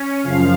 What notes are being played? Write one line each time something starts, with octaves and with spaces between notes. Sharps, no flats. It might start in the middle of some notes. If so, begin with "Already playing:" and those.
Already playing: C#4
F#2 C#3 F3 F5